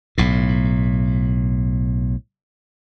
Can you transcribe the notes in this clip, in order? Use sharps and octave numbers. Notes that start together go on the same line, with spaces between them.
B1 A2